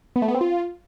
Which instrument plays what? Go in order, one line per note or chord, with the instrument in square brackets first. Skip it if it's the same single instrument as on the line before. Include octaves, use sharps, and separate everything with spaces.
[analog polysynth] B3
A3
B3
C4
F4